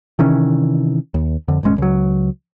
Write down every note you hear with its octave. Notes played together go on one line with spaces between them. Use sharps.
C3 D#3 E3 C#4
D#2
F2 D3
D#1 G#1 G#3 C#4
C#2 F#3